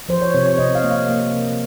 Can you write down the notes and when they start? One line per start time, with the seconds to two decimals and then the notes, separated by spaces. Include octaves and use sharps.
0.09 F3 C5
0.22 C#5
0.34 C3 C#5
0.46 C#5
0.58 C3 D#5
0.75 F5
0.84 A#3
0.91 F5
1.09 A#3
1.34 C3